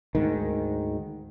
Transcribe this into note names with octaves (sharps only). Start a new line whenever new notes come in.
D2 G#2 D#3